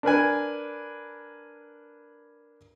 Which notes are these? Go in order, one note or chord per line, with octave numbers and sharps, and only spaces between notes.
D4 A#4 B4 G#5